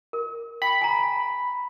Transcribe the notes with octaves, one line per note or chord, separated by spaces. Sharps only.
A#4
G5 B5
G#5 A#5